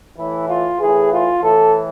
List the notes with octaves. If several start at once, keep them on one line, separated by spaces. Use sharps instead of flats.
A2 E3 E4
F4
A2 E3 G#4
F4
A2 E3 A4